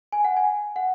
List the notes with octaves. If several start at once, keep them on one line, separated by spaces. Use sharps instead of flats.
G#5
F#5
G#5
F#5